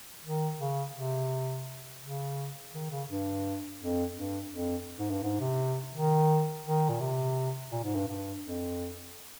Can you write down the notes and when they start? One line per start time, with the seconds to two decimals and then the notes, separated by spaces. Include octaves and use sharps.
0.24 D#3
0.60 C#3
0.95 C3
2.02 C#3
2.74 D#3
2.91 C#3
3.09 G2
3.80 F2
4.15 G2
4.52 F2
4.99 G#2
5.10 G2
5.23 G#2
5.40 C3
5.95 D#3
6.65 D#3
6.89 A#2
7.01 C3
7.72 A#2
7.84 G#2
7.96 G2
8.08 G2
8.43 F2